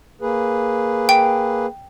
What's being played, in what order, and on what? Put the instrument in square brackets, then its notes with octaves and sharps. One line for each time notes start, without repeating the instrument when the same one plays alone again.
[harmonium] A#3 G#4 B4
[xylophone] G5